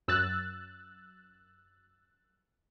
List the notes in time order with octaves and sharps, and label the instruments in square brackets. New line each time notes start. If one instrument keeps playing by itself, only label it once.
[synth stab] F#2 E6 F#6 A6